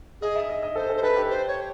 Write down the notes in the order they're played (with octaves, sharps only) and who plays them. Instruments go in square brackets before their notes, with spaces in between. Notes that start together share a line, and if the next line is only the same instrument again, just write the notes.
[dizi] G#4 [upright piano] D#5
[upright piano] E5
D#5
D#5
[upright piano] A4 [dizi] C5
[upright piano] A4
[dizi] C5
[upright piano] A4 [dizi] B4
[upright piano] G4
[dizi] C5
C#5